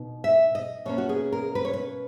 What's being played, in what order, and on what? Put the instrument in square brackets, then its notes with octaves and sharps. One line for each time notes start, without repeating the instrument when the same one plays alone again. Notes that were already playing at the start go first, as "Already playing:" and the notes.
Already playing: [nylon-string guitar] B2 D#4
E5
D#5
B2 A#3 C#4 C#5
F#4
G#4
A#4
B4
C#5
B4